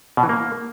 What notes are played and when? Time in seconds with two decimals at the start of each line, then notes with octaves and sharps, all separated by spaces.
0.17 B2
0.23 E3
0.29 A#3